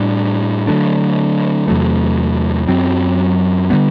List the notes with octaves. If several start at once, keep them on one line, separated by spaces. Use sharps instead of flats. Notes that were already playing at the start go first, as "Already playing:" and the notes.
Already playing: A2 G3 D4
D3 F#3 A3 D4
E2 C3 F#3 A3
F#2 F#3 C4
D3 G3 B3